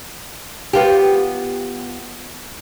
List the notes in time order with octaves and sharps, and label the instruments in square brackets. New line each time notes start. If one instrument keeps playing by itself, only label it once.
[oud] B3 F4 G4